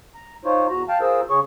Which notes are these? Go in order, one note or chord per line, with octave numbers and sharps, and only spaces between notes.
A#5
D#4 F4 C5 C#5
E2 F#4 A#5
F5 G5 A5
F4 G#4 A#4 C5 E6
C#3 G#4 C#5 C#6